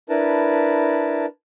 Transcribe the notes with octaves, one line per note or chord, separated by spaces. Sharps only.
D4 E4 A#4 B4 A5